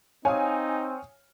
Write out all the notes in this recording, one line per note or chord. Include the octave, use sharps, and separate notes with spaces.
C4 D#4 C#5 F5 G#5 D#6